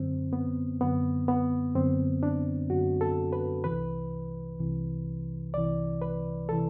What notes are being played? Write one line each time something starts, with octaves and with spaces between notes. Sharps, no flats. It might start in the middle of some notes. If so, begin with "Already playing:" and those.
Already playing: F#2 D3 C4
B3
F#2 D3 B3
B3
F#2 D3 C4
D4
F#2 D3 F#4
A4
B4
C2 C3 E3 B4
C2 C3 E3
C2 C3 E3 D5
B4
C3 E3 A4